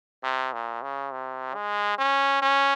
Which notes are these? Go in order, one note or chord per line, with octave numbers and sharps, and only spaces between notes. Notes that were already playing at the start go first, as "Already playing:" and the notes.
C3
A#2
C#3
C3
G#3
C#4
C#4